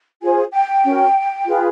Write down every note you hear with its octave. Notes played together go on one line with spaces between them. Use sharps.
F4 G#4 C5 G#5
G5
C#4 F#4 A#4
F4 G#4 B4